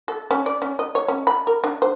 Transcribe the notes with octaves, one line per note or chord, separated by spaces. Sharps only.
A4
C#4
D5
C#4
D#5
C#5
C#4
B5
A#4
D4
C5